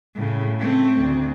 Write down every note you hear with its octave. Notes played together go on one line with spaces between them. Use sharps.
A2 C#3
A3 C4
D2